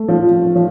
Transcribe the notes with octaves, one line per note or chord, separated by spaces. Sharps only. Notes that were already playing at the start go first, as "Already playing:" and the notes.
Already playing: A3
F3
F3